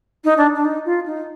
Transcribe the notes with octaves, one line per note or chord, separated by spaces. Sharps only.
D#4
D4
D4
D#4
F4
D#4